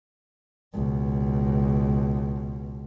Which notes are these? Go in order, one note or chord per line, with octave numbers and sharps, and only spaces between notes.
C#2 B2